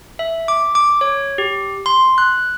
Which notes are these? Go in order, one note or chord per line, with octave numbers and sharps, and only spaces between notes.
E5
D6
D6
C#5
G4
C6
F#6